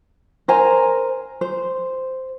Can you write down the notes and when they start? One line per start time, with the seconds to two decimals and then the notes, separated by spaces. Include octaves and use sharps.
0.48 A#4 C5 G#5 A#5
1.41 C5